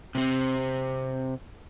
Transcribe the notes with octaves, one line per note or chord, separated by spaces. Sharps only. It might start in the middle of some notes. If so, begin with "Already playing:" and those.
C3 C4